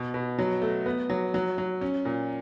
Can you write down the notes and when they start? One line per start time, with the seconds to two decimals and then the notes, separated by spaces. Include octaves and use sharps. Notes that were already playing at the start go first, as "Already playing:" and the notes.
Already playing: B2
0.14 B2
0.39 F#3
0.62 A3
0.86 B3
1.10 F#3
1.34 F#3
1.58 F#3
1.81 C#4
2.05 A#2